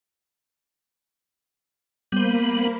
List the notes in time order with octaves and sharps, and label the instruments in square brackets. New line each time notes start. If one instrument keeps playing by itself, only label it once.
[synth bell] G3 C5 [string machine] A#3 B5 [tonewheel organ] B3